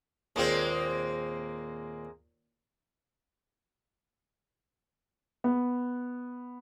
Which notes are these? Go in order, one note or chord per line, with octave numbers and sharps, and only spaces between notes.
D#2 A#2 G#3 A#3 C4
B3